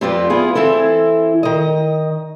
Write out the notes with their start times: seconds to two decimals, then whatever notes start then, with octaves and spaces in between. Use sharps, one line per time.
0.01 F2 C4 F4 G4 B4 D5
0.30 B3 E4 F4 G#4
0.55 E3 C4 E4 A4
1.43 D#3 D#5